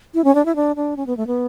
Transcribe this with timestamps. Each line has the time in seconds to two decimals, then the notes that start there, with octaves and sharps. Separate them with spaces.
0.14 E4
0.24 C#4
0.35 D4
0.45 E4
0.56 D4
0.76 D4
0.97 C#4
1.07 B3
1.17 A3
1.27 B3